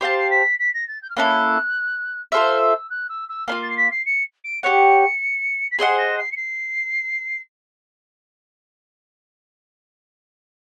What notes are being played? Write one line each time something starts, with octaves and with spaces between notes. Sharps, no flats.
G4 C5 F5 A5 C7
C7
B6
B6
A#6
A6
G6
F6
A#3 C#4 E4 A4 F#6
F4 A4 C5 E5 F6
E6
F#6
E6
E6
A#3 D4 F4 F6
A6
C7
B6
C7
C#7
D7
G4 A#4 C#5 F#5 C#7
B6
G#4 C5 D#5 F#5 C7
A#6
C7
C#7
C7